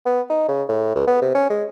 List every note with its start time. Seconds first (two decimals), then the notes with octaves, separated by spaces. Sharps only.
0.06 B3
0.30 D#4
0.48 C#3
0.69 A2
0.95 C#2
1.07 B3
1.22 C3
1.35 C#4
1.50 G#3